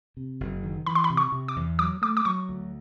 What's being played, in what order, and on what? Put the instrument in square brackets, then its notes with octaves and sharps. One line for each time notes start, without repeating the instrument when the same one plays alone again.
[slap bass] C3
F#1
D#3
[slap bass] E3 [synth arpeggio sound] B5
[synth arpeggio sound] C6
B5
[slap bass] C3
[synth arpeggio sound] C#6
[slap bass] C3
[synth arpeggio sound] D6
[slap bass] E2
[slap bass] F#3 [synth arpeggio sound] D6
[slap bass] A3 [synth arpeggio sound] D6
[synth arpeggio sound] D6
[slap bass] F#3 [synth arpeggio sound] C#6
[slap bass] D2